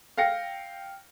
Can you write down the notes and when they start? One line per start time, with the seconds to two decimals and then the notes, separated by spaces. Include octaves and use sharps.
0.18 F5 G5 A#6 C#7